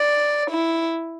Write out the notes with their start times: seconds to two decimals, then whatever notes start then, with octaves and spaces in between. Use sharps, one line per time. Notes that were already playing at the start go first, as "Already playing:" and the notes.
Already playing: D5
0.51 E4